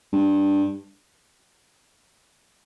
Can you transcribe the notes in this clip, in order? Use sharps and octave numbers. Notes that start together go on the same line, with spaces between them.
G2